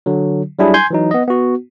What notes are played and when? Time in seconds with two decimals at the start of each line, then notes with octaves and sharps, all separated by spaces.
0.06 D3 F#3
0.59 F#3 G3 D4 E4 G#4
0.74 G#5 C6 G6 G#6
0.90 E3 F#3 D#4
1.11 B3 D#5
1.28 B3 F#4